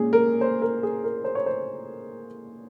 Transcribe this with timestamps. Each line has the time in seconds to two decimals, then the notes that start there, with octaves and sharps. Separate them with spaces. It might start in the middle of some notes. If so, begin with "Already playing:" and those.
Already playing: A#2 G#3 C#4 G#4
0.13 A#4
0.41 C5
0.62 A#4
0.83 G#4
1.04 A#4
1.24 C5
1.35 C#5
1.46 C5